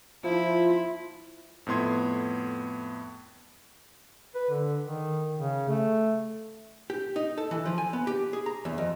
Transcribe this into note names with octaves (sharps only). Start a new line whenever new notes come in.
F3 E4 F4
F2 A2 B3 C6 G#6
B4
D3
D#3
C#3
A3
G4
D#4
A4
E3
F3
G#5
B3
G4
G#4
A#5
E2
F2